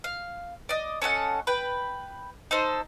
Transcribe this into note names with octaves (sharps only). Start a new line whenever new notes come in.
F5
D5 D#5
C#4 A4 D#5 F#5
B4 G5
D#4 A4 C5